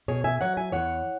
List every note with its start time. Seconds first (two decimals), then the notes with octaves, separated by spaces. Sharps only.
0.08 B2 G#4 C#5
0.24 E5 G#5
0.41 F#3 C#5 F#5
0.57 E5 G#5
0.72 E2 C#5 F#5